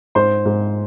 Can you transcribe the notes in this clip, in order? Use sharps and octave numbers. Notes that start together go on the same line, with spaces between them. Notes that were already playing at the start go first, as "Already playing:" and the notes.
G#2 C5 C6
G#2